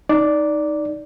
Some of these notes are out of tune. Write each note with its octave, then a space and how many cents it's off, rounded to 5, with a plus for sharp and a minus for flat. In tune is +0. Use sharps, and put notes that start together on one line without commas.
D#4 +0 D5 -5